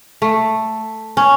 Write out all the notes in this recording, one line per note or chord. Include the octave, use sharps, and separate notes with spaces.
A3
C#4